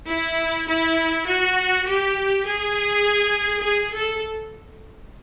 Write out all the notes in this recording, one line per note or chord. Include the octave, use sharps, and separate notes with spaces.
E4
E4
F#4
G4
G#4
G#4
A4